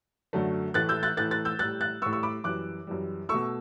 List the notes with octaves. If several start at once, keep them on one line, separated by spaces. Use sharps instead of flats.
F#2 D3 F#3 A3
A2 E3 A3 F#6 A6
E6 G6
F#6 A6
A2 E3 A3 F#6 A6
F#6 A6
E6 G6
A2 G3 F#6 A6
F#6 A6
A2 G3 C#6 E6
C#6 E6
B5 D6
F#2 E3 G3 D6 F#6
F#2 E3 G3
B2 A3 C#6 E6